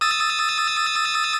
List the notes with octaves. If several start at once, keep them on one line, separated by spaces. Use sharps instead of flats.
D#6 E6 A6